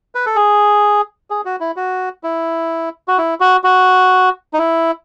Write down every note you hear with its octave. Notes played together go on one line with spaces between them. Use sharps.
B4
A4
G#4
G#4
F#4
E4
F#4
E4
F#4
E4
F#4
F#4
D#4
E4